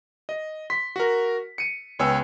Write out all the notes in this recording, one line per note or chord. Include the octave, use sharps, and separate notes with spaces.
D#5
C6 B6
F#4 A#4
C#7 D#7
C#2 B3 C#5 G5 G#5 E6